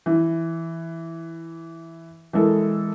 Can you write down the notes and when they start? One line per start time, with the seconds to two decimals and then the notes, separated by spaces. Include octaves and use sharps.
0.06 E3
2.33 E3 G#3 A4 A#4